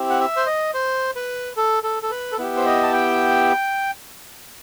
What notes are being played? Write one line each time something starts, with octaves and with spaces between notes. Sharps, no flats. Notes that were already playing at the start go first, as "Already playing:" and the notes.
Already playing: C4 E4 G4
F#5
E5
C5
D#5
C5
B4
A4
A4
A4
B4
A4
B3 E4 G4 B4
C5
D#5
A5
G5